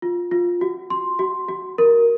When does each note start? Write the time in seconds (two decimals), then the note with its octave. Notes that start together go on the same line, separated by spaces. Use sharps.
0.02 F4
0.31 F4
0.61 F#4
0.90 C6
1.19 F#4
1.49 F#4
1.78 A#4